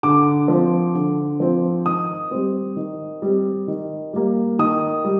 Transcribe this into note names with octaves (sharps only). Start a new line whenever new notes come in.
D3 D6
F3 C4
D3
F3 C4
D#3 D#6
G3 C4
D#3
G3 C4
D#3
G3 A#3
D#3 D#6
G3